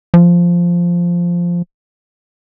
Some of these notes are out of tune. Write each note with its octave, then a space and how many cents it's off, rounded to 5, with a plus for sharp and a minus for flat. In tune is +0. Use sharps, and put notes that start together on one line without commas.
F3 -5